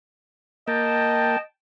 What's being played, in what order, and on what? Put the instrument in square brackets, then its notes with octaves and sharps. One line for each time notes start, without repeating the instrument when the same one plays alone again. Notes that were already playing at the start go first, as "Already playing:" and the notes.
[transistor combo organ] A#3 [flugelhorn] D#5 [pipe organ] G5 A5